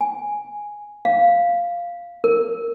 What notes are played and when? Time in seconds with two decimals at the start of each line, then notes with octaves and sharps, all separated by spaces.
0.01 G#5
1.05 F5
2.24 A#4